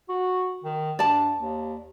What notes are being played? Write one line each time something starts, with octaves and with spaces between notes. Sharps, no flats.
F#4
D#3
G2 D5 A5
D#2